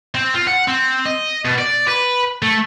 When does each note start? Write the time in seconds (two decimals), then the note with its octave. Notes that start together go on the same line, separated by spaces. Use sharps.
0.15 C4
0.35 F4
0.47 F#5
0.68 C4
1.05 D#5
1.45 B2
1.58 D5
1.88 B4
2.42 A3